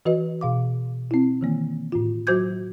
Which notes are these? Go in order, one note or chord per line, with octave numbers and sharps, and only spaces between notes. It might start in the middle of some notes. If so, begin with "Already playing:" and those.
E3 F#4 B4 D#5
B2 F5 D6
C4 E4
D#3 E3 A#3
A2 F4
F#3 F#4 C5 D6 G6 G#6